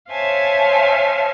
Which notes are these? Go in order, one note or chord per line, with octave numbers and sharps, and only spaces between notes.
C5 C#5 E5 F5 G#5 A5